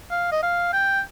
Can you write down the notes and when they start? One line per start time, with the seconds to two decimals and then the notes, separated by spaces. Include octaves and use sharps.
0.11 F5
0.32 D#5
0.43 F5
0.73 G5